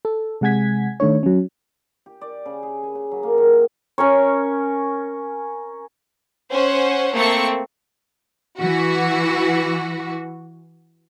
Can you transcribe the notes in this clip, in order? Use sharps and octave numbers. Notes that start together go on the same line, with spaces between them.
A4
C3 G#3 F#5 G#5 G#6 B6
D#3 A3 D4 C#5
F#3 C#4
G4
D5
C#3
G#4
G#5
C#3
F#3
A#3
D#3
G5
C#4 A#4 C#5
C#4 C5 F#5
A3 A#3 C4 A4 C#6 C#7
E3 F#4